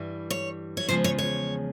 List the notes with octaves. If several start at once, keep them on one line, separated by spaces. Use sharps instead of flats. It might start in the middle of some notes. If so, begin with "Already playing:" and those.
Already playing: G2 E3 G3
C#5
C#5
E2 C#3 F3 G#3 C5
C#5
C#5